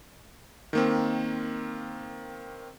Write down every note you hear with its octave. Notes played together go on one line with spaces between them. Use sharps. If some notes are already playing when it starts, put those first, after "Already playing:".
D#3 A#3 C4